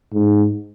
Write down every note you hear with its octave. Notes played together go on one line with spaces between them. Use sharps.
G#2